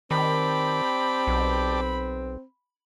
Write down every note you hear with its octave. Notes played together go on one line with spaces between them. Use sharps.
D#3 C4 G4 D5 A5 B5
B1